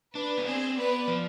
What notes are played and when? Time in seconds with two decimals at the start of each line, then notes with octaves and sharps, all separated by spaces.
0.15 D4 B4 D5
0.38 B3
0.46 C4 G#4 C5
0.77 B3 B4 D5
1.08 F3